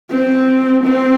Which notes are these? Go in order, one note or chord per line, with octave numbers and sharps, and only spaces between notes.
C4
C4